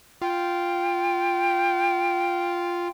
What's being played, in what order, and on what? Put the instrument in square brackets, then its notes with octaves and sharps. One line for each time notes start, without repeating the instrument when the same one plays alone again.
[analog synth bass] F4 [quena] G5